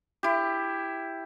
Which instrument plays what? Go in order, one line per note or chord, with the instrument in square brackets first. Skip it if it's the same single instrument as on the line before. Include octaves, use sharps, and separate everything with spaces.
[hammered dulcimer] E4 G4